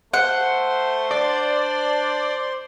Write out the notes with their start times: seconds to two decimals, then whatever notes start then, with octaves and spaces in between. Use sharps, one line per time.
0.14 A3 C5 F#5 C6
1.11 D4 D5